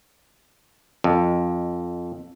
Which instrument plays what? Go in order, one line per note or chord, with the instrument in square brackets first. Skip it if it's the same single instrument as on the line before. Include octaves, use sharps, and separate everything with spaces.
[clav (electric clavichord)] F2